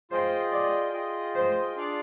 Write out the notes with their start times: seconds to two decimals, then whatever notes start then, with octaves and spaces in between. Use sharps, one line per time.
0.11 F4 G#4 C5 D#5 G5
0.52 D5
0.93 F4 G#4 D#5 G5
1.35 C5
1.76 D4 F4 G#4 D5 F5